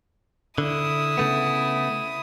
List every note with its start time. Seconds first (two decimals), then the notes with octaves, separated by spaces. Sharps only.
0.58 D3 E4 D#6
1.17 C#3 A3 B3